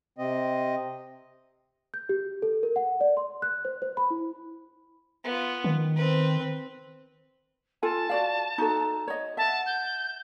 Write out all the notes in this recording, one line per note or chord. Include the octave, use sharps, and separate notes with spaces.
C3 C4 D#5
G6
G4
A4
A#4
F#5
D5
C6
F#6
C5
C5
B5
E4
B3 F4
D#3
C4 B4
F4 A4 G#5 A5
F#4 D5 F5
D#4 F#4 A4
C#5 D#5
E5 F#5 A5
G6